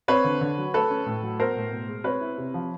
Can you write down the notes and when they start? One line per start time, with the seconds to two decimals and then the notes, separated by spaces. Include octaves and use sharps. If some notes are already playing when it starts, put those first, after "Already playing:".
0.08 C4 B4 C#5
0.24 D3
0.41 D3
0.58 F#3
0.74 A3 A4 B4
0.90 C#4
1.06 A2
1.23 F#3
1.40 B3 A#4 C5
1.56 A2
1.71 B2
1.89 G#3
2.04 C4 B4 C#5
2.21 E4
2.38 C3
2.54 F3